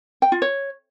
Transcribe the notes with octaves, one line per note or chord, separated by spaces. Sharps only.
G5
F4
C#5